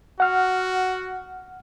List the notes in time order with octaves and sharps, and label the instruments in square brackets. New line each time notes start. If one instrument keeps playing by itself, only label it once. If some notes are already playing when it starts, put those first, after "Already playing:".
[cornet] F#4 [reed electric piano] F#5 F6